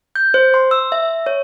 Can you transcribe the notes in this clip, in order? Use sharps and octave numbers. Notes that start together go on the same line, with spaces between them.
G6
C5
C6
E6
E5
C#5